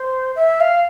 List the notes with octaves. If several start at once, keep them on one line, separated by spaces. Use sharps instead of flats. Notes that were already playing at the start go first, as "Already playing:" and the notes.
Already playing: C5
E5
F5